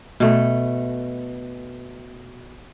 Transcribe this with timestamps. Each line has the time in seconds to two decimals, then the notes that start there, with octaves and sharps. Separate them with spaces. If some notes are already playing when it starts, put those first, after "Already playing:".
0.20 B2 A3